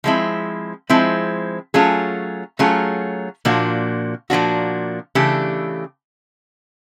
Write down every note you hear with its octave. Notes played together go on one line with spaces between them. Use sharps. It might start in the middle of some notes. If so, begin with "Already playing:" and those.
F3 G#3 C4 E4
F3 G#3 C4 E4
F#3 A3 C#4 F4 G#4
F#3 A3 C#4 F4 G#4
A#2 F3 A#3 D4 F#4
A#2 F3 A#3 D4 F#4
C#3 E3 A3 D4 G4